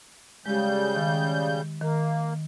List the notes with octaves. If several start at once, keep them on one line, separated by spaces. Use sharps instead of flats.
C#3 G3 G#3 G4 G6
D#3
D#3 A#3